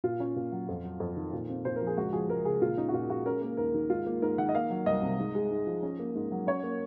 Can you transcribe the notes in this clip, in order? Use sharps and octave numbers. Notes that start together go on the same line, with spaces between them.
A#2 F4
C#4
A#2
F#3
F2
F#3
F2
D#3
A#2
C4
A#2 C5
F3 A#4
G#4
C#2 F#4
F3 G#4
C#2 A#4
C#3 G#4
A#2 F4
C#4 D#4
F#4
A#2 F4
G#3 F#4
C#4 A#4
A#3
D#2 A#4
D#3
G#2 F4
A#3
G#2 A#4
D#3 F#5
D#5
A#3 F5
F#3
C2 D#5
C3
G#2
G#3
G#2
F3
C#4
A#3
G#2
F#3
C#4 C#5
A#3